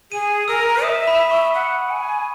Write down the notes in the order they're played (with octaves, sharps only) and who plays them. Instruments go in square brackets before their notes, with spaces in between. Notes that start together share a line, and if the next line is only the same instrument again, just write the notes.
[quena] G#4 [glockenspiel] D#7
[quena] A#4 [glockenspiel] E6
[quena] E5 [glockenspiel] D#6
[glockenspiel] B5
C#6
[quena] F#5
G#5